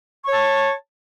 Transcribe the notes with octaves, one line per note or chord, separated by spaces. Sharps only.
C#5 A5 C#6